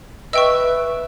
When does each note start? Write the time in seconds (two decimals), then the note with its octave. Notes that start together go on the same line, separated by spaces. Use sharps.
0.33 B4 D#5 E5 G5 C#6